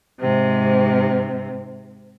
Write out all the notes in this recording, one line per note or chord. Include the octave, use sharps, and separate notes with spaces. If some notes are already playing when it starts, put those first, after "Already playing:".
G#2 C3